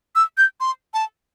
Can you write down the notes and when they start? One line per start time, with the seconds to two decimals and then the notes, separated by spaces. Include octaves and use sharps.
0.16 E6
0.38 G6
0.60 C6
0.94 A5